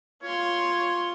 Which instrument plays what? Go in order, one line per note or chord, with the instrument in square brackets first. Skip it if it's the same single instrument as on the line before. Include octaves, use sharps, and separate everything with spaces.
[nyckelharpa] F4 C6 [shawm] C#5